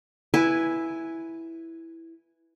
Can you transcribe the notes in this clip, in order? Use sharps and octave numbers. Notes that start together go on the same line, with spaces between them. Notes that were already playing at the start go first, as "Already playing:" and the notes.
E4 B4 G#5